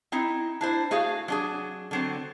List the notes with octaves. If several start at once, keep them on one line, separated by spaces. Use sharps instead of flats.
C4 D#4 E4
D4 E4 C5
A3 F#4 G#4 F5
F#3 D4 G#4
D3 F#3 C4